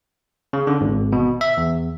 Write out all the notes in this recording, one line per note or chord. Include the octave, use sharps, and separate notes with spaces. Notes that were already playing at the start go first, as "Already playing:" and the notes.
C#3
D3
G#1
B2
E5
E2